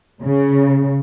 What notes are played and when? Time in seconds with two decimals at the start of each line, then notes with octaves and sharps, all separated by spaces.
0.24 C#3